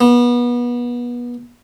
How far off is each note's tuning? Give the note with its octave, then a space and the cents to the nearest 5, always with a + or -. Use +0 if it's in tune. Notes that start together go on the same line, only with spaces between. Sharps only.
B3 -30